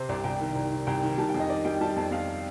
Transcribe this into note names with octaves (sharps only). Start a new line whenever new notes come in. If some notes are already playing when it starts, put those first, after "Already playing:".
Already playing: C3 C5
C2 D5
C2 G5
D#3
C2
D#3
C2 G5
D#3
G3 A5
G5
F2
D#5
D#3 D5
G3 G5
G3 A5
F2 A5
F2 F5